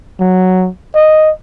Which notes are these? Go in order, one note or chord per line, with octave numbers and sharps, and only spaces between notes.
F#3
D#5